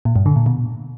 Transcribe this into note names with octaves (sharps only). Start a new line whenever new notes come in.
A#2
G2
D3
A#2
B2